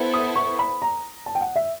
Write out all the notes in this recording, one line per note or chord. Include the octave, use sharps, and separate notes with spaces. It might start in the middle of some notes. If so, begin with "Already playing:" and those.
Already playing: B3 E4 A4 C5
D#6
C#6
B5
A#5
A5
G5
F#5
E5